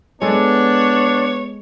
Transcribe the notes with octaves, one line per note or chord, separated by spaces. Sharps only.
G#3 B3 D4 A4 C#5